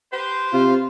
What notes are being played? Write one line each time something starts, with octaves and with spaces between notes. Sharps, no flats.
G4 B4 C5
C3 F4